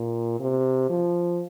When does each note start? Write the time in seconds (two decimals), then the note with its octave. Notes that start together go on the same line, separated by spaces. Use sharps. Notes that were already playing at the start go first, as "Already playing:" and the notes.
Already playing: A#2
0.40 C3
0.90 F3